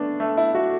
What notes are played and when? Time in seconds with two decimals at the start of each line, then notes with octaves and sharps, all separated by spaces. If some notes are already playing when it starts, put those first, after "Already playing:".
Already playing: A3 B3 D4
0.20 A3
0.37 E4
0.55 F#4